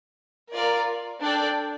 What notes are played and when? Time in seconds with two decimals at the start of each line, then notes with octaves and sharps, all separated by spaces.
0.55 F4 A#4 D5
1.20 D4 A4 D5 G5